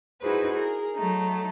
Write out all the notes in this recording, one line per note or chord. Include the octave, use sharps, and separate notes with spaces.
D#4 E4 F#4 G#4 B4 C5
G#4 A#4
F#3 A3 D#4